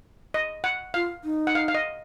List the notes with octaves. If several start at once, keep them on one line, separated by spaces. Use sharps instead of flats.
D#5
F#5
F4 F5
D#4
F#5
F5
F5
D#5